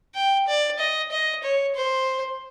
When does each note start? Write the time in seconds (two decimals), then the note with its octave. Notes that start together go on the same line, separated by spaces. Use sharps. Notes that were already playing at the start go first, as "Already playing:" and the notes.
0.15 G5
0.48 D5
0.79 D#5
1.11 D#5
1.43 C#5
1.75 C5